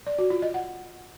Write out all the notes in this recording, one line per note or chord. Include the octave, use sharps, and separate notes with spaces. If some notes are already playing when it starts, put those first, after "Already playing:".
D5
F#4
F4
D#5
F#5